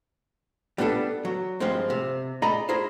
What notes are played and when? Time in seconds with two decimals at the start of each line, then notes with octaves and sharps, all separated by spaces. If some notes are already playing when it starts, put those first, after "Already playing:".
0.78 G3 B3 D4 F4 A4
1.25 F#3
1.60 G2 F3 G#3 C4
1.90 C3
2.42 G#4 D5 D#5 G#5 A#5 B5
2.69 E4 G#4 A#4 C5